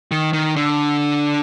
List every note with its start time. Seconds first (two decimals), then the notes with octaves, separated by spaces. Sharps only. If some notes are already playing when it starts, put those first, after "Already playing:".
0.11 D#3
0.33 D#3
0.56 D3